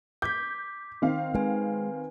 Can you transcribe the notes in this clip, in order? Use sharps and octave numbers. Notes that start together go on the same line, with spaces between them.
D6 G6 B6
D#3 C4 F5
G#3 B4 G#5